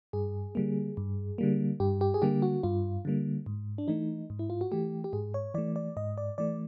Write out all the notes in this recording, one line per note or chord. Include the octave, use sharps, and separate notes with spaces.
G2 G#4
D3 G3 A#3
G2
D3 G3 A#3
G2 G4
G4
G#4
D3 G3 A#3 G4
F#4
G2 F4
D3 G3 A#3
G#2
D4
E3 A3 D#4
G#2
E4
F4
F#4
E3 A3 G4
G4
G#2 G#4
C#5
E3 A3 D5
D5
G#2 D#5
D5
E3 A3 D5